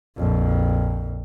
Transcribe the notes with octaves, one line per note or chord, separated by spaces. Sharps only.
A#1 F2